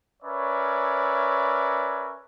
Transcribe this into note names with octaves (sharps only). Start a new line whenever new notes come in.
C#4 A#4 B4 C#5 D5 E5